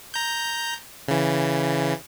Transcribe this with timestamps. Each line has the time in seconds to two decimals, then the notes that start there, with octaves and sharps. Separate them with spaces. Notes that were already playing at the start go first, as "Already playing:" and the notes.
0.14 A#5 G6
1.08 C#3 E3